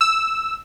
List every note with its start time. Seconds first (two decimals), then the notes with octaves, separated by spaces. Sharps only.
0.01 E6